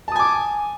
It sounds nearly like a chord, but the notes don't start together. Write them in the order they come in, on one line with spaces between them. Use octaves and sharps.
A5 D#6 G#5 D6